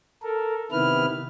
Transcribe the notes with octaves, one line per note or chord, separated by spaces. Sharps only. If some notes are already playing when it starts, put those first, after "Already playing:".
A4 A#4
C3 D#3 B3 E4 B4 F6